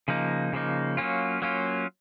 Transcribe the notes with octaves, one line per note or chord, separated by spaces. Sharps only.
C#3 F3 A#3 D#4
C#3 F3 A#3 D#4
F#3 A#3 C#4 F4
F#3 A#3 C#4 F4